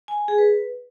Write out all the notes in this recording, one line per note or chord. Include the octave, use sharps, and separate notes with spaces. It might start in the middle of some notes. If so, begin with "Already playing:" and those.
G#5
G#5
G#4
B4